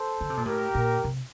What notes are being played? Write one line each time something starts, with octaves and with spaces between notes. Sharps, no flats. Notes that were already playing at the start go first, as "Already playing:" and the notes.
Already playing: A4 C5
D3
C3
A#2
A2 G4 A#4
A#2
C3